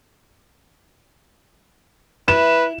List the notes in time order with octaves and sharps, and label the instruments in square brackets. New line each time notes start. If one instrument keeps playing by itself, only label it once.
[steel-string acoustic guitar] E4 [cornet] B4 [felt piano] E7